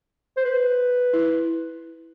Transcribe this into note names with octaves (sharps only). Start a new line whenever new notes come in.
C5
B4
E4